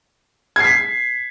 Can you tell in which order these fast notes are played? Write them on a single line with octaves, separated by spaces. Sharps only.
G#6 C7 B6